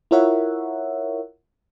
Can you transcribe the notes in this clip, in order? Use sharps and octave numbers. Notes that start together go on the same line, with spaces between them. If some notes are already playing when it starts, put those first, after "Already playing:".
E4 F4 A#4 C#5 E5 F#5